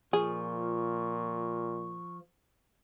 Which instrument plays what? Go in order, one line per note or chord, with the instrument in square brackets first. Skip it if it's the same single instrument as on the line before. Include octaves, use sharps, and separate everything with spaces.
[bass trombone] A#2 [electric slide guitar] F3 [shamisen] G#4 [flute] C#6